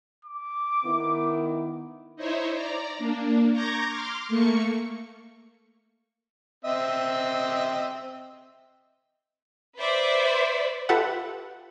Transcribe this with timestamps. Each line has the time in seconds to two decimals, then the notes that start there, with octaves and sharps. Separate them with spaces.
0.25 D6
0.85 D#3 B3 E4
2.16 D#4 E4 C5 C#5 E5
2.53 D5 A#5
2.98 A#3 D4
3.52 A#5 C#6 D6 G6 G#6 A#6
3.89 C6 D6 F6
4.28 A3 A#3 C#6 C#7
6.65 C4 D#5 E5
9.78 B4 C5 D5 E5
10.89 F4 G4 A4 B4 E5 F#5